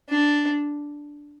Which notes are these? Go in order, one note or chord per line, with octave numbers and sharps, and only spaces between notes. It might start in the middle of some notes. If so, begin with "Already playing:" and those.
D4